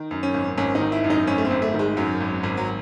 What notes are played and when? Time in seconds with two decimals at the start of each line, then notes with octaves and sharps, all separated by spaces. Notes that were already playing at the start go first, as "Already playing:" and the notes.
Already playing: D#3
0.11 F#2
0.23 C#4
0.34 G#1
0.58 G#1 C#4
0.75 D#4
0.80 D#3
0.92 E4
1.04 F#2
1.10 D#4
1.27 G#1 C#4
1.38 A3
1.45 C4
1.51 G#1
1.62 A3
1.74 D#3
1.79 G#3
1.97 F#2 F#3
2.20 G#1
2.43 G#1
2.57 F#3